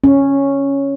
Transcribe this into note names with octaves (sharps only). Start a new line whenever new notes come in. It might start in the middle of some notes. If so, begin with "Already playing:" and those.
C#4